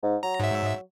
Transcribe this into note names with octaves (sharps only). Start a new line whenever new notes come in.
G#2
F#3 A#5
G#2 E5